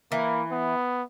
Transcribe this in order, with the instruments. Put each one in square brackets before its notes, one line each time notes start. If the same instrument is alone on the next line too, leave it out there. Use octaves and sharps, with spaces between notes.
[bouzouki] E3 [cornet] A#3
[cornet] B3